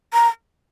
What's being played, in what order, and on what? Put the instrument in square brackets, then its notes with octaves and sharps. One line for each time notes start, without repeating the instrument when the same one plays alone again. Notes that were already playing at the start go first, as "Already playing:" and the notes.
[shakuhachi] A#5